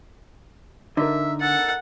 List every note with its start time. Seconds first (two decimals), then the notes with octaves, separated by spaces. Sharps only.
0.97 D3 D#4 A#4 E5
1.41 A4 F#5